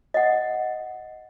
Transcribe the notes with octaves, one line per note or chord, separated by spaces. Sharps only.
D#5 F#5